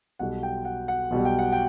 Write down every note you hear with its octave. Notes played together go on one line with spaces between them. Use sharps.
B1 B2 G3 F#5
G5
F#5
F#5
B1 B2 G3
G5
F#5
G5